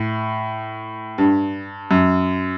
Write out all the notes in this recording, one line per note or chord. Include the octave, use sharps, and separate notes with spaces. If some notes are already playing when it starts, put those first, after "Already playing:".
Already playing: A2
G2
F#2